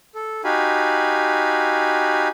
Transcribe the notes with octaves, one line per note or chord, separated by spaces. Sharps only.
A4
D#4 F#4 G4 F5 G#5 B5